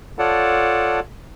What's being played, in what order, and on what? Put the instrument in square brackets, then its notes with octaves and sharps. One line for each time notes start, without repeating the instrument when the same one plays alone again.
[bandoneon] F4 A4 C#5 D5 F#5 A5